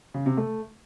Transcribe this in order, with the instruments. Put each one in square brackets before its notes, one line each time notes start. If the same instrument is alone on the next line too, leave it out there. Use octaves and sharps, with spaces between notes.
[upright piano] C#3
C3
A3